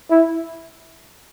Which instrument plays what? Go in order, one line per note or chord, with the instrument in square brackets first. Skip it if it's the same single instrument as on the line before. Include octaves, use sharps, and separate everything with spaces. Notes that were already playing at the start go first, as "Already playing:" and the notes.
[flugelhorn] E4